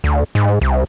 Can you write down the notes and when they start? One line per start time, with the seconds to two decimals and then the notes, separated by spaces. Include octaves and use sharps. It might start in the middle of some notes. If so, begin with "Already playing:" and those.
0.04 D2
0.35 G#2
0.62 C2